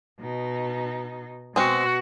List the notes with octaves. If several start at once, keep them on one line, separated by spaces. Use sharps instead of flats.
B2 D#4
B2 G#3 C4 F#4 F#5